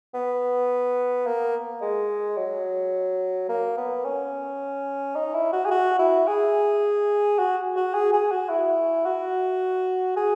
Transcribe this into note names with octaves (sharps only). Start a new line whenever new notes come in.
B3
A#3
G#3
F#3
A#3
B3
C#4
D#4
E4
F#4
G#4
F#4
E4
G#4
F#4
F#4
G#4
G#4
F#4
E4
F#4
G#4